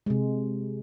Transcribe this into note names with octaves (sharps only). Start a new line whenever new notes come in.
C3 G#3